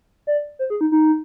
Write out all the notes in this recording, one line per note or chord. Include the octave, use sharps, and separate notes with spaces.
D5
C5
G#4
D#4
D#4